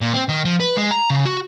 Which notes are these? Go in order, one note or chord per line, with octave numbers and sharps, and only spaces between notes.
A#2
C4
D#3
F3
B4
G#3
A#5
C#3
F#4